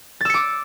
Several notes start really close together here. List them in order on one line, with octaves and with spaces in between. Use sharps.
A6 E6 C#7 D6